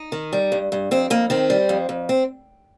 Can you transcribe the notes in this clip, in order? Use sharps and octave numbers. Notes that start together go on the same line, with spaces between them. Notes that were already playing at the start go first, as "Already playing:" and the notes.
Already playing: D#4
D#3
G3
G2
G2
F2 C4
F2 A#3
D#3 C4
G3
F2
F2
C4